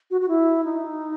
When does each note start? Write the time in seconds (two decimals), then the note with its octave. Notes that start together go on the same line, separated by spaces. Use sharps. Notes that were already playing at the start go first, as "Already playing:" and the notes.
0.11 F#4
0.21 F#4
0.28 E4
0.64 D#4